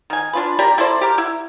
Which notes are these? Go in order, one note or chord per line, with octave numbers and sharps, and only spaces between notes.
D#3 G#5
D4 F4 B4
G4 A#4 D5 A#5
E4 A4 C5 D5
G4 A#4
E4